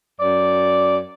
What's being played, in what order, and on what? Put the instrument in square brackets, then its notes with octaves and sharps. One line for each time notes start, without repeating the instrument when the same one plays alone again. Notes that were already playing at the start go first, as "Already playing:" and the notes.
[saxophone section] F#2 D5